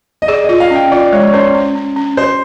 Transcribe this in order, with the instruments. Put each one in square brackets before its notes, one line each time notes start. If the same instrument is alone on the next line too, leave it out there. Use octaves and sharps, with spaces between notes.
[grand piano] D#5
[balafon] G#4 [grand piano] D5
[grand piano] D#5
[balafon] F4
[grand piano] F5
[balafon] C#4
[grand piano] G5
[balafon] F4 [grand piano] D5
[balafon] G#3 [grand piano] C#5
[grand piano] C#5
[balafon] C#4 [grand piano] C5
[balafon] C#4
C#4
C#4
[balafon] F#4 [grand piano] C5